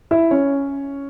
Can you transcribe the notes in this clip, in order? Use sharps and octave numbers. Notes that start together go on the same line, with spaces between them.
E4 E5
C#4 C#5